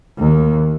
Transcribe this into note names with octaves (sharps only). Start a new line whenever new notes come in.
D#2